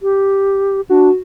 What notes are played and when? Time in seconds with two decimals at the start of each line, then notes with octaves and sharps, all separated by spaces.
0.02 G4
0.90 D4 F#4